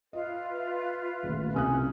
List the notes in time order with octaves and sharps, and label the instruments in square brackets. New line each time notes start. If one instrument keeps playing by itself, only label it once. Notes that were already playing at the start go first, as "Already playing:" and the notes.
[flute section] F4 B4 E5 [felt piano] D#5
[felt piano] D#1 A1
[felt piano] C2 D#6 F#6 [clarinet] C#4